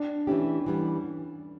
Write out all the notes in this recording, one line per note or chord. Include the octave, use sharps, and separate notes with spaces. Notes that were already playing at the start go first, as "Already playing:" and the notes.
Already playing: D4
E3 A3 C#4 E4 G4
E3 G3 B3